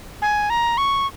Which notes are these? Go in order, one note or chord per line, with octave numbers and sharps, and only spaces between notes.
G#5
A#5
C#6